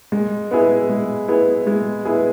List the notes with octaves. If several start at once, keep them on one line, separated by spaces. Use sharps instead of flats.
G#3
B3 E4 G#4
G#3
B3 E4 G#4
G#3
B3 E4 G#4